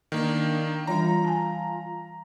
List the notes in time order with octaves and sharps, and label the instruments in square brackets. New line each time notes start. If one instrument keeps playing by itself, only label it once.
[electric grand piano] D#3 A#3 [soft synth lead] D4
[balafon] E3 G3 D4 [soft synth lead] F4 [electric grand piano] A#5
[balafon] G#5 A5